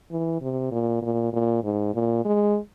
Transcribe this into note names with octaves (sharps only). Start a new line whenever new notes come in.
E3
C3
A#2
A#2
A#2
G#2
A#2
G#3